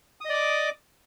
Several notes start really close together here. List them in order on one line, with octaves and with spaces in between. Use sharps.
D#6 D#5 D5 D6